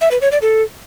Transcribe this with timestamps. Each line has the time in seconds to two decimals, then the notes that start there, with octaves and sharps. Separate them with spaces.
0.01 E5
0.11 B4
0.21 C#5
0.32 D5
0.42 A4